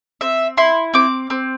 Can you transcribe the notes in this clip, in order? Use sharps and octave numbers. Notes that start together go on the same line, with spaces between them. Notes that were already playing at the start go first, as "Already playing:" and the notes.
C4 E5
E4 C6
C4 D6
C4